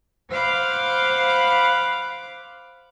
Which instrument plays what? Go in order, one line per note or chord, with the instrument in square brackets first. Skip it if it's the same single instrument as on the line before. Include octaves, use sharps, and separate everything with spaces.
[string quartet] C5 F5 F#5 B5 D6